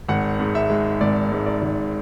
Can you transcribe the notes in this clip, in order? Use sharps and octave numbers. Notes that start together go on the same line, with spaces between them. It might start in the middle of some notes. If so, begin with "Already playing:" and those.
G#1 F#5
G#2
E5
G#3
G#1 D5
G#2
D5
G#1